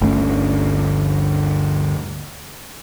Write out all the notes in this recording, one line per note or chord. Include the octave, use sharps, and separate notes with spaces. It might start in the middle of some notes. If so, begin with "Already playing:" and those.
G1 D2 A3 C#4